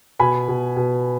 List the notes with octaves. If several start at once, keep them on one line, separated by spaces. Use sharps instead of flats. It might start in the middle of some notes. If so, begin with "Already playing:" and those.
B2 G#5 B5
B2
B2